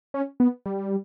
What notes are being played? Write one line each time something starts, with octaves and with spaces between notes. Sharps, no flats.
C#4
B3
G3